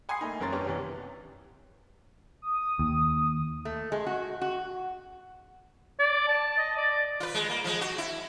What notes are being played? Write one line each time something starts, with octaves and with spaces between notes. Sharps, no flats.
F#5 G#5 B5 C6 D#6 C7
A3 A#3 D#4
F#1 F#2 A#4 C#5 C6 A6
B3 C#4 D4 G4 C#5
G#1 C3 E3
D#6
D#2
A3
G#3
F#4
F#4
D5
A5
D#5
D5
F4 B4
G#3
A#3
F3 G#3
F#4
E4